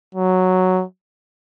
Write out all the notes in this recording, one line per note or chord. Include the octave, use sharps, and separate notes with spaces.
F#3